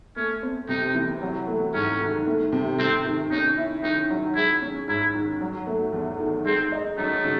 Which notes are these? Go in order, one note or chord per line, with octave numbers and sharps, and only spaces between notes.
A3 C#4
C4
C3 D#4
E3
F#3
A3
G#2 C#4
D#3
A3
C3
C3 C4
D#3
C#4 D#4
E4
D#3 D#4
F#3
G#3 E4
C#4
G#2 E4
D#3
F#3
A3
E2
D#3
G#3 C4
D#4
F#2 A3
C#3